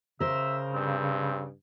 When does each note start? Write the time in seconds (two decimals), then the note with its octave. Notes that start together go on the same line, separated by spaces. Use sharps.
0.20 C#3 A#4 C5 E5
0.74 G2 C4